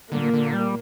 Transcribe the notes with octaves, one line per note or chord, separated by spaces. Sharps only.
A#2 D3 A#3
D3
G3